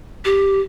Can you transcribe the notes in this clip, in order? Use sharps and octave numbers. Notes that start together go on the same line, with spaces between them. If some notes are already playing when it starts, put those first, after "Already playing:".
G4